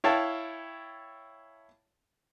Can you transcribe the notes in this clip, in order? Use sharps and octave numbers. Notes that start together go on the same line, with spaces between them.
E4 C#5 F5 G5 A5